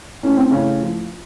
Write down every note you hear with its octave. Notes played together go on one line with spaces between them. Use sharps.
A2 C#4
C4
A2 C#3 C#4
F3